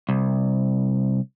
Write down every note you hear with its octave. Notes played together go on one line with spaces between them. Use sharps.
C2